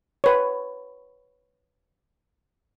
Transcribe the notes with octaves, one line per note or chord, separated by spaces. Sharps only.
B4 C#5